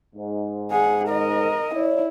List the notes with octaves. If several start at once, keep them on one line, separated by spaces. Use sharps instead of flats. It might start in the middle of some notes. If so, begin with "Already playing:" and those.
G#2
G#4 F#5
A#4 D#5
E4 C#5 D5